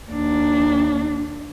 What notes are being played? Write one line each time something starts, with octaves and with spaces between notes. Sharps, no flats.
D#2 D4